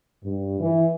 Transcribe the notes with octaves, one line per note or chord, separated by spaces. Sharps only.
G2
E3